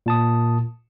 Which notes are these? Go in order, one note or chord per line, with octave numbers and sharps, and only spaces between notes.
A#2 A5 D#6